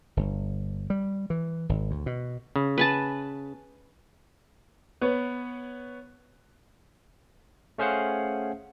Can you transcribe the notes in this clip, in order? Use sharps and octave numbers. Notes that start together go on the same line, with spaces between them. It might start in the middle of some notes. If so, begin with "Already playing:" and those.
G1
G3
E3
G#1
D2
B2
C#3
B4 G#5 A5
B3 B4 C#5
A3 C#4 G#4 C5 F5 F#5